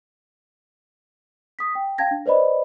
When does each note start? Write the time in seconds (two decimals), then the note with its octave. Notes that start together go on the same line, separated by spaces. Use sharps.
1.59 D#6 B6
1.75 G5
1.98 F5 G5 A5 G#6 A#6
2.11 D4
2.26 B4 C5 D5 D#5 B5